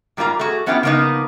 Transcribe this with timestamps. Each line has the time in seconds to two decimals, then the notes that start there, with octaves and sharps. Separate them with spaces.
0.17 G#2 G3 A#3 F4 A#5
0.39 A3 F#4 G#4
0.66 A3 B3 C#4 E4 F4 G4
0.83 C#3 F3 A#3 B3 D#4